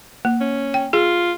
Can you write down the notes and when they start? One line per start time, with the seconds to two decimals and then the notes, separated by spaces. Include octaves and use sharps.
0.25 A#3
0.40 C#4
0.74 G5
0.93 F4 G#4